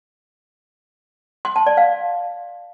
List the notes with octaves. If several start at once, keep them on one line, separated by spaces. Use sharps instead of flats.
C6
A5
D5
F5